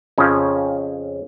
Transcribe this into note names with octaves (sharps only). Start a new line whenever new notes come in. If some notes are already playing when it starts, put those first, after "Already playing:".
F2 C#3 F3 C#4